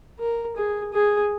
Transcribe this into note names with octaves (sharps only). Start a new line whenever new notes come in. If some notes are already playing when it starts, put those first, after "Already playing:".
A#4
G#4
G#4